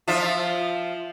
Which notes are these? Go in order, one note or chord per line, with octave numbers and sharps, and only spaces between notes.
F3 F4 E5